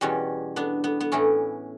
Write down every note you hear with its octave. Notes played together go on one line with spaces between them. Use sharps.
E2 B2 G3 C#4
B3 D4
B3
B3
A2 E3 A3 C#4